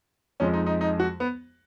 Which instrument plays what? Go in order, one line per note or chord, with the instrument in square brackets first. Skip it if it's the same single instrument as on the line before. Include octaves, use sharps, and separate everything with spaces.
[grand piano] F2 F3 G#3 C#4
D#4
D#4
D#4
F#4
B3